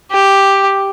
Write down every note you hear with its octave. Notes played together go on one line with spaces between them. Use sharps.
G4